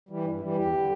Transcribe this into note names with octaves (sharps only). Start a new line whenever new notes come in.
E3 G3
G2
E3 G3
E2 G4
D3 G3